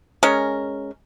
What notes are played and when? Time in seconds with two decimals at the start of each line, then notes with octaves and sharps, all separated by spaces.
0.23 G#3 C#4 A#4